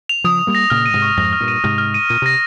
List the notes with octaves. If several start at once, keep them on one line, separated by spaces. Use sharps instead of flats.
F7
C#3 F3 D#6
D#6
G3 A#3
A#6
A#2 C#3 F6
D#7
G#2 C3
C#6
F2 G#2 A#6
F6
G2 A#2
D#7
G#2 C3 F6
F6
D#7
A#2 D#7
C3 A#6